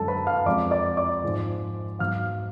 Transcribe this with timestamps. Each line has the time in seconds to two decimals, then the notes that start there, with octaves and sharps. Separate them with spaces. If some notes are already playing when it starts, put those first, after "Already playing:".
Already playing: F#2 D3 G#3 C#4 A4 A5
0.08 B4 B5
0.27 F5 F6
0.46 F2 F3 G#3 D5 D6
0.71 D5 D6
0.97 D5 D6
1.24 G#2 F3 G#3
1.99 G#2 F#3 B3 F5 F6